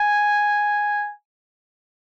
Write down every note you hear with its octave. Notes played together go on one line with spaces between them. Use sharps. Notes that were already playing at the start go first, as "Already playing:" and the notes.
Already playing: G#5